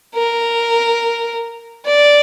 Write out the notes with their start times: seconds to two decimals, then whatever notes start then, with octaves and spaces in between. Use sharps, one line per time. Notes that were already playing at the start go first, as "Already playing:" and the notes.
0.15 A#4
1.86 D5